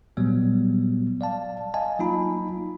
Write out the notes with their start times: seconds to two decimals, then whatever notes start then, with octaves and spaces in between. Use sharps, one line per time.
0.17 A#2 F#3 G3 B3
1.21 D5 F5 A5
1.74 D#5 F5 G#5 A5
1.99 F#3 A#3 D#4 F4 A#5 B5